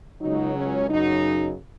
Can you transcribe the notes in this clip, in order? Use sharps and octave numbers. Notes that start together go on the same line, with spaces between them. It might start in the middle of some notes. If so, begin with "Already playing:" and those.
C#2 C#3 F#3 D#4
C#4
F#2 C#3 F#3 D#4